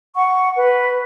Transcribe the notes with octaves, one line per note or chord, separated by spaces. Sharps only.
F#5 C#6
B4